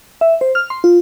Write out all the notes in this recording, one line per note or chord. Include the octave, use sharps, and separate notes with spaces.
E5
C5
F6
C6
F4